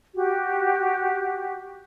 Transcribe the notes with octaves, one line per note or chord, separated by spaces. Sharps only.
F#4 G4